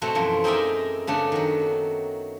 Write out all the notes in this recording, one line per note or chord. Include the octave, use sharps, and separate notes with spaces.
B2 A3 C4 F#4
F#2 E3 F3
C4 D#4 G#4 A#4 D5 E5
C#3 A3 B3 D4
D#3 F#3